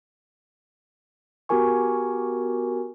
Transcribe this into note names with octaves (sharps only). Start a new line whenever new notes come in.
B3 F#4 G4 A#4 G#5 C#6